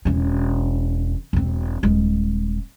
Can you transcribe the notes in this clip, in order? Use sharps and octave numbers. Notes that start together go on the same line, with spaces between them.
E1 C#4
E1 C4
D#1 G#3